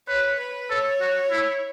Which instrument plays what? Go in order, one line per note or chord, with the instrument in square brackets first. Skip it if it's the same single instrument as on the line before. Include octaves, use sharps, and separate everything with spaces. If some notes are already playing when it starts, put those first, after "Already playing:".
[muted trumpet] B4 [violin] C#5
[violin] B4
[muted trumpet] A4 [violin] C#5
[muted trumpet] F#4
E4